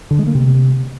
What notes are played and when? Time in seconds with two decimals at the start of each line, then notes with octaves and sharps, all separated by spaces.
0.11 D3
0.19 G#3
0.27 A#3
0.35 C3